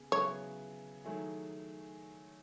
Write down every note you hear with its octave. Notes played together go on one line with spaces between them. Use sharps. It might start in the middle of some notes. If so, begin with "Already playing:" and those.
Already playing: C#3 B3 G#4
C#3 F#3 B3 E4 G#4 C#5
D#3 F#3 A3 E4 G#4